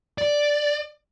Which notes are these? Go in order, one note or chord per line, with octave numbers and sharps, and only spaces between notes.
D5